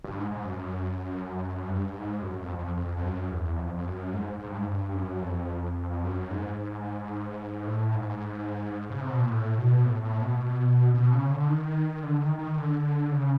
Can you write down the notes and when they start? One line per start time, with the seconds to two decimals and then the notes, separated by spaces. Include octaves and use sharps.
0.04 G2
0.18 G#2
0.31 G#2
0.45 F#2
1.68 G2
1.95 G#2
2.22 F#2
2.41 F2
2.59 F2
2.77 F2
2.97 F2
3.04 F#2
3.31 E2
3.59 F2
3.74 F2
3.86 F#2
4.13 G#2
4.40 G#2
4.48 G2
4.57 G#2
4.67 G2
4.94 F#2
5.22 F2
6.04 F#2
6.31 G#2
7.67 A2
7.95 G#2
8.90 C#3
9.01 C3
9.10 B2
9.20 A#2
9.30 A2
9.58 B2
9.85 A2
10.03 A2
10.21 B2
10.94 B2
11.12 C#3
11.30 D3
11.48 D#3
12.03 D3
12.21 D#3
12.39 D#3
12.58 D3
13.12 C#3